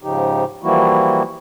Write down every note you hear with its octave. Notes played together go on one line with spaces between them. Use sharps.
G#2 C#3 F3 D#4 G4
E3 F3 G3 A#3 E4 F#4